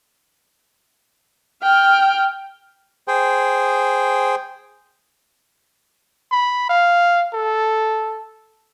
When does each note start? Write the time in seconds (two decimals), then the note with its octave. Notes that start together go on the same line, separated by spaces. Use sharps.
1.62 G5 F6
3.08 G#4 C5 G5
6.31 B5
6.70 F5
7.34 A4